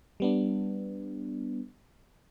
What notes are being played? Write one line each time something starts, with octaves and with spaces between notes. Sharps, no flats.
G3 B3 D4